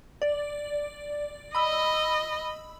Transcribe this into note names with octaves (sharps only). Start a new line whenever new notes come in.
D5
D#5 B5 E6